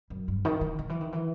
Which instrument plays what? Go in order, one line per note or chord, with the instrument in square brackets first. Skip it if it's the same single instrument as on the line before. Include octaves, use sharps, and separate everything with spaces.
[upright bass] F#2
G2
D#3
D#3
D#3
E3
D#3
E3